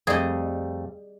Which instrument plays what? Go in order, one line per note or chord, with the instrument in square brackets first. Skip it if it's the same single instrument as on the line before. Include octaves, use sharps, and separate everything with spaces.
[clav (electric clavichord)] F2 A3 [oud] G3 [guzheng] G#4 D#5